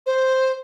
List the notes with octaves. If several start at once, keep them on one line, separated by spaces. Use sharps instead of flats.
C5